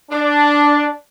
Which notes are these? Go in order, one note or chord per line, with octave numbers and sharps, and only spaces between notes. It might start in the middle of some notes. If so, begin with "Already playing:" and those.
D4